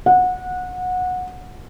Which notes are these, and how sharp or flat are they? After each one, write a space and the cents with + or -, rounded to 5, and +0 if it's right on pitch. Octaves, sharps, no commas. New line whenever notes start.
F#5 -20